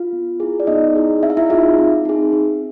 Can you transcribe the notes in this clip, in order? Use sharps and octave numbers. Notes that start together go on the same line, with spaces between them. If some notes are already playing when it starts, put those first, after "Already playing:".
Already playing: F4 F5
B3
E4 G#4
D5
B3 D#4 D#5
E4 G#4
C4 E5
F5
E4 E5
D#4 F4 G#4 F5
C4
D#4 G#4
C4